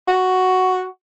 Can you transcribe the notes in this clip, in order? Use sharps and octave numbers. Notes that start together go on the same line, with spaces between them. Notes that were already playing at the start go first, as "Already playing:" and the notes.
F#4